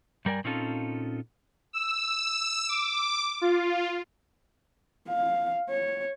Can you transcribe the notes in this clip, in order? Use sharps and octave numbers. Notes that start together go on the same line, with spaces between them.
G2 G3 A#4 D5 G#5
A#2 C4 C#4 D#4 F4 A4
E6
D6
F4
F5
C#5